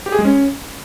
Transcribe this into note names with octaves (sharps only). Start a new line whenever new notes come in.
G4
G#4
G#3
C#4